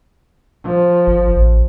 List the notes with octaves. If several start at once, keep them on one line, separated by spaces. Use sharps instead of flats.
F3
G1
A1